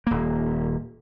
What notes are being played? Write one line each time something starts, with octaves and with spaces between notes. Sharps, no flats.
D#1 A#3